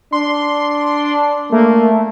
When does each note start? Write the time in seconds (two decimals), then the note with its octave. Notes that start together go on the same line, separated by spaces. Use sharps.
0.13 D4 C6
1.52 A3 A#3